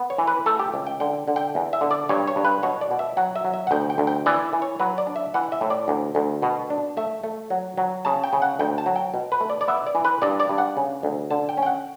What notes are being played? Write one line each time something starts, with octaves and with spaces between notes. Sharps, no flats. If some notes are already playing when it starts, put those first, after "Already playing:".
Already playing: B3
C#5
E3
B4
A3 A4
G4
C#2
G5
D3 G5
D3
G5
E2
E5
D3
D5
G2 C#5
C#5
G2
B4
B2 C#5
D5
B2
E5
F#3 F#5
E5
F#3
E5
F#5
D2 G5
G5
D2
G5
E3 D5
E3
C#5
F#3 B4
D5
D4
E5
E3 F#5
E5
A2
D5
D2
D2
B2
D4
A3 E5
A3
F#3
F#3
C#3 A5
G5
C#3
F#5
D2 G5
A5
F#3
G5
B2
B4
A3
D5
D5
B3 E5
D5
E3
B4
G2 D5
D5
G2
F#5
C#3
D2
D3 A5
G5
C#4
G5
F#5